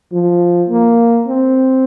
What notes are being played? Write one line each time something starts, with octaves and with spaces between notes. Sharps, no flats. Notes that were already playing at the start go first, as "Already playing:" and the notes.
F3
A#3
C4